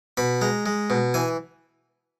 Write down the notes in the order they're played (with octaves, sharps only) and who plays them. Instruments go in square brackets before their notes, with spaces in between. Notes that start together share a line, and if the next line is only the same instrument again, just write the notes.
[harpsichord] B2 B5
G#3 A#5
G#3
B2
E3 G#5